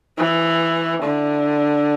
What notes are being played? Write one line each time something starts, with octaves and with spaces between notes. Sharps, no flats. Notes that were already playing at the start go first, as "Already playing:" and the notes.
E3
D3